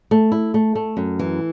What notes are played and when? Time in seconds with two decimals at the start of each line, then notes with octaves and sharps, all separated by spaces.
0.11 A3
0.32 E4
0.54 A3
0.75 A3
0.97 F#2
1.19 E3